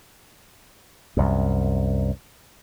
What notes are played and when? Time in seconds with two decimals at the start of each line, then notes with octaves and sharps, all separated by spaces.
1.17 C2 F#2